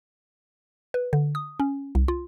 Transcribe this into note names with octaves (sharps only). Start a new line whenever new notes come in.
B4
D3
D#6
C#4
C2
F4